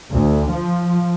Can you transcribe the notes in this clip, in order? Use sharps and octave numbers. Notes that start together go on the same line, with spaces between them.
D2
F3